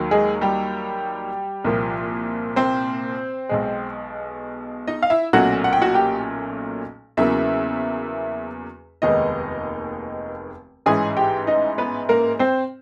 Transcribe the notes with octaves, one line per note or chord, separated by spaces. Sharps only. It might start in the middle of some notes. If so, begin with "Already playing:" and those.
Already playing: D#2 D#3 F#3 A#3
G#3 G#4
G3 G4
C2 A#2 F3 A#3
C4 C5
B1 B2 G#3
D#4 D#5
F5
E4 E5
B1 A#2 F#3 A3 C#4 F#4 F#5
F#5
G5
F#4 F#5
G4 G5
E2 C#3 F#3 A#3 E4 E5
F1 D#2 D#3 G#3 B3 D#4 D#5
A1 G#2 E3 G#3 C#4 G#4 G#5
G4 G5
D#4 D#5
B3 B4
A#3 A#4
C4 C5